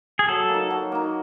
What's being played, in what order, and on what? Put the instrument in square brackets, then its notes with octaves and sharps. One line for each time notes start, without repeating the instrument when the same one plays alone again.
[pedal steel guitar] G#4
[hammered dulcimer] F#3 [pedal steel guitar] A4
[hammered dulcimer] A#3
D#4
F#3
A#3 D#4